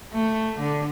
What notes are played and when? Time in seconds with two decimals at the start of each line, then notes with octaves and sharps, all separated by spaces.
0.13 A3
0.60 D3